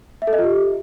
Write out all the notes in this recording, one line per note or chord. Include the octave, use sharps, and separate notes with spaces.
E5
A4
D#5
F4
G4